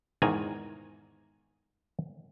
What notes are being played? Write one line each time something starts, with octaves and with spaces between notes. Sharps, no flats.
E2 G#2 D#3 G#5 A#5